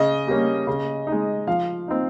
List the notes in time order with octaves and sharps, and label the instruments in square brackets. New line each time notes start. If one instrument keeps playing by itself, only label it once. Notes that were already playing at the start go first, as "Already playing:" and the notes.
Already playing: [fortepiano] C#3 [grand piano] D#5
[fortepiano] G3 A#3 C#4
C#3
D#4
G#3
[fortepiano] F3 [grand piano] F5
[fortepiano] C4 D#4